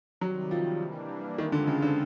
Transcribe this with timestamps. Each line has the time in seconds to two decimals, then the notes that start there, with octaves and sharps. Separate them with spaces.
0.21 C3 D#3 F#3 G3
0.51 F3
0.79 E3 G3 A#3 D4
1.38 D#3 G#3 C4 F4 A4
1.52 D3
1.67 C#3
1.82 D3